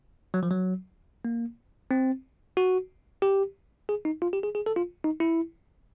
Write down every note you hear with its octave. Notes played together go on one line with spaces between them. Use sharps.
F#3
F3
F#3
A#3
C4
F#4
G4
G#4
D#4
F4
G4
G#4
G#4
A4
F4
D#4
E4